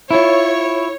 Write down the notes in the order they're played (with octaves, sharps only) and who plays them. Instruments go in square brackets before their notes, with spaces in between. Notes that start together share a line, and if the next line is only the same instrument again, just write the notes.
[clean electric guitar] E4 F4 [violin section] C#5